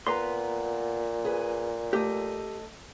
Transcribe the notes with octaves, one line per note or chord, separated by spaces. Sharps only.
A#2 B3 B4 A#5 C6
G#4 B4
A3 G4 D#5